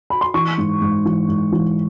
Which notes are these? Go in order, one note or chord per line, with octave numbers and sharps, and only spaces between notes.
B5
C6
E3 C#6
G#2
G#2
E3
G#2
E3